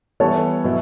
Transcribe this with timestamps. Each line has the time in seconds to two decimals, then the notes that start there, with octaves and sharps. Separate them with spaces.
0.20 E3 G3 B3 A4 C#5
0.64 B2 F#3 B3 E4